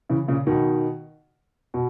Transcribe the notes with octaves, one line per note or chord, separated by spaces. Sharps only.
C#3 E3
A#2 C#3
B2 D#3
B2